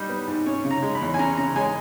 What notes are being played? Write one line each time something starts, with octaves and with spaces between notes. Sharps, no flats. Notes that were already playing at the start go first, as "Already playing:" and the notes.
Already playing: G3 D#4
B3
G#2
C#4 C#5
C#3
A#5
G#3
B5
E2
G#5
C#4 A#5
C#3 A#5
G#3 G#5